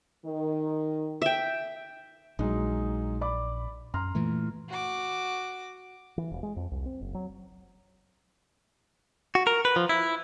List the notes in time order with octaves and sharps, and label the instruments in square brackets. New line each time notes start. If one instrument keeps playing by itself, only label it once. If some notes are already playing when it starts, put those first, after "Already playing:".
[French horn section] D#3
[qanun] E5 G5
[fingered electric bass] A#1 [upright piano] F#3 G#3 D#4
[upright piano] D5 B5 D6
[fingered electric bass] F#2 [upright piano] A#5 C6 F6
[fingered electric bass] A#2 E3 A3
[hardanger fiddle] F#4 D6
[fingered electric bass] E3
E1
G#3
F2
C2
C4
F#1
F#3
[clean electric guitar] F#4
A#4
B4
F3
E4